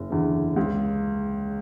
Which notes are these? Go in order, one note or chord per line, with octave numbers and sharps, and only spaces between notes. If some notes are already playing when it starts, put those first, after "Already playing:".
Already playing: F#1
E2 D3
C#2